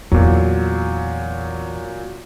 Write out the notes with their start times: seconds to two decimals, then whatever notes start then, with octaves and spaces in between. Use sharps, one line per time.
0.12 E2 A#2 F#3